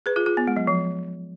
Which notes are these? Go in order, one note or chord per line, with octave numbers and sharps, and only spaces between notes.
G#4 B4
F4 G#4
F4 G#4
B3
G#3
F#3
F3